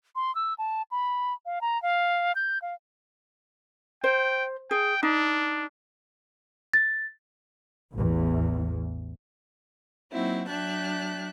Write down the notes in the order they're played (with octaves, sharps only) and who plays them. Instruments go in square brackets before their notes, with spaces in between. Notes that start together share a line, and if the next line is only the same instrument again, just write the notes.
[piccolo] C6
E6
A5
B5
F5
A#5
F5
G6
F5
[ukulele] C5 [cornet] G5
[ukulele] G#4 [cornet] G5
[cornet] D4 [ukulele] D#4
[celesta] A6
[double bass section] A1 E2
[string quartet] F#3 A#3 C4 D#4 E4 F#4
F#3 D4 E5 G5 A5 F#6